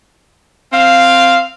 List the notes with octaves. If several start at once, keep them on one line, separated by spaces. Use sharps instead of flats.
C4 F5